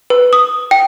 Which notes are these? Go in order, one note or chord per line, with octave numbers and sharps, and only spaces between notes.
B4
D#6
G5